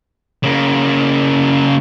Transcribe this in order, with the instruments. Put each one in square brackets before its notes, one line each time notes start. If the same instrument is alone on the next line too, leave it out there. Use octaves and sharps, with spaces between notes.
[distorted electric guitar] C#3 A#3